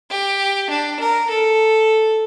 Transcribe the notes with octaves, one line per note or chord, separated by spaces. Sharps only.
G4
D4
A#4
A4